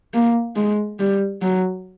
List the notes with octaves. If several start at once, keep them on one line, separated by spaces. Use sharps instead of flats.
A#3
G#3
G3
F#3